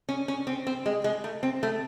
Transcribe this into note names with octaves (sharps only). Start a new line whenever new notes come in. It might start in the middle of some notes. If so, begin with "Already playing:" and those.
C#4
C#4
C4
C4
G#3
G#3
A3
C4
A3